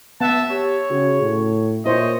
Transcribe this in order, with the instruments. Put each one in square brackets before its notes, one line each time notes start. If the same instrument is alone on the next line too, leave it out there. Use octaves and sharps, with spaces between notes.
[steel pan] B3 F#5 [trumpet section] E5 A5
[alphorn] G4 [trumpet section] C#5
[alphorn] C#3 [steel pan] F#4
[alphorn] A2
[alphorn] A#2 [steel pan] E4 C5 [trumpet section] C#5 D#5